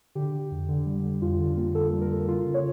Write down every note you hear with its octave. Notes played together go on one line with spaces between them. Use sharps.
D3 G4
D3
F2
D3
G3
D3
F2 F4
D3
A#3
D3 A4
G3
A#4
A#3
C#3 F4
C#3
C#5